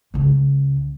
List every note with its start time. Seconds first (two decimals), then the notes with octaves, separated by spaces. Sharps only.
0.14 C#2 C#3